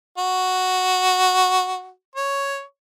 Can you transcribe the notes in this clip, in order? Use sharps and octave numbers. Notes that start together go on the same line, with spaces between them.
F#4
C#5